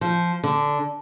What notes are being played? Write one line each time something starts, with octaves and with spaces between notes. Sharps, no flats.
F3
D3